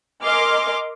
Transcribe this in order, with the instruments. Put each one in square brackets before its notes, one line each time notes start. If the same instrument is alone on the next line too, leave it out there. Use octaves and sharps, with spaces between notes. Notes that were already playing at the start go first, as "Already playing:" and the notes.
[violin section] A#4 D#5 G#5 C6 D6 F6